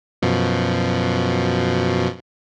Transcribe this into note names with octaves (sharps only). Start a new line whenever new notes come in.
F#2 B2 F3